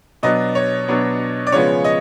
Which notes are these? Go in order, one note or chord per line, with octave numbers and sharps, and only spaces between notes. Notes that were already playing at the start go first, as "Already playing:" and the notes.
B2 F#3 B3 D4 D#5
C#5
B2 F#3 B3 D4
D5
C#3 F3 G#3 B3 C#5
D#5